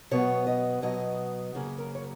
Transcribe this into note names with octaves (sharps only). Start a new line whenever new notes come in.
B2 F#3 B3 C#5
D#5
B2 F#3 B3 D#5
F#2 C#3 F#3 A#3 G#4
A#4
C#5